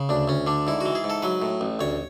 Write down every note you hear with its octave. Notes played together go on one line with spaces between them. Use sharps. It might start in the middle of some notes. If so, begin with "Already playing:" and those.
Already playing: C#3
D2 D4
D2 C#4
D3 D4
G#2 E4
E3 F#4
G#4
G#2
A4
F#3 B4
A2
A1
D2 C#5